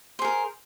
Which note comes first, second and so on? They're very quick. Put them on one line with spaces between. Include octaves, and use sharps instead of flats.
C5 G#4 A#4